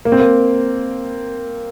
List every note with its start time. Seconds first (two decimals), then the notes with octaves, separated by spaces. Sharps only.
0.05 A#3
0.12 C4
0.20 A#3